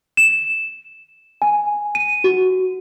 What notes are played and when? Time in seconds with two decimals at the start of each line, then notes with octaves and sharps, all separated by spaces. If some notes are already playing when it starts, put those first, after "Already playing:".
0.17 E7
1.42 G#5
1.95 D#7
2.24 F#4